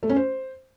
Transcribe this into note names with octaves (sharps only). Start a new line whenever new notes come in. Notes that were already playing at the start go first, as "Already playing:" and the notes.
A3
C#4
C5